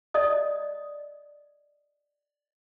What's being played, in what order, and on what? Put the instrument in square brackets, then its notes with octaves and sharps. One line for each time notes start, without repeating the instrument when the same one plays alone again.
[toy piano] D5 D#5 D#6